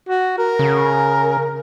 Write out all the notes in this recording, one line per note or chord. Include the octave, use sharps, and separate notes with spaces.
F#4
A#4
C#3